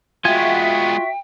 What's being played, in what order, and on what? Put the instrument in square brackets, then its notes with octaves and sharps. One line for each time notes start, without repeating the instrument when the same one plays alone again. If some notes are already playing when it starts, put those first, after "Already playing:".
[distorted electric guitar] G#3 B3 [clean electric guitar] F4 G#5 [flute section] F#4 E5 [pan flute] G5